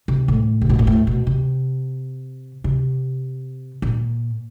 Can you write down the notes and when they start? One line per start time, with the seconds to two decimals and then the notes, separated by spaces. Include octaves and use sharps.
0.08 C3
0.28 A2
0.62 C3
0.69 B2
0.79 A#2
0.87 A2
1.07 B2
1.27 C3
2.64 C3
3.82 A#2